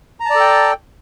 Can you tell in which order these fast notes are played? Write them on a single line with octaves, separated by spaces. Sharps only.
A#5 A5 D5 A4 G5